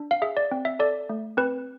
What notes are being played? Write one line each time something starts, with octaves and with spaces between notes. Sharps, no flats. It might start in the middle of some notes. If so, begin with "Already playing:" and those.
Already playing: D4
F5
G#4 E5
D5
C4
E5
A4 D5
A3
C4 B4